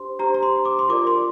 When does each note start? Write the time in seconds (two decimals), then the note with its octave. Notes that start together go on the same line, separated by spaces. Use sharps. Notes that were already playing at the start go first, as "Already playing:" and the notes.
Already playing: D4 G4 C5 C6
0.19 D4 G4 C5 A#5
0.34 A#5
0.43 C6
0.65 D6
0.79 C6
0.89 F4 A#4 D5 D6
1.07 C6